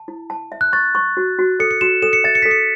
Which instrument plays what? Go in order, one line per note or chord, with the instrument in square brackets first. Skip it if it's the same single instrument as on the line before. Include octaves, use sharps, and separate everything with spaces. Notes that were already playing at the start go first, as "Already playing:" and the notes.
Already playing: [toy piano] A5
E4
A5
E5
[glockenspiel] F#6
[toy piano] C#6 [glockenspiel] A6
[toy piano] C#6
F#4
F#4
[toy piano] A4 [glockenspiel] C#7
[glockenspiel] C#7
[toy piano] F#4 [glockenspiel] E7
[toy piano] A4 [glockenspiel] E7
[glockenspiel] C#7
[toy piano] E5 [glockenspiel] A6
[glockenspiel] C#7
B6
[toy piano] A4
[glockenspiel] C#7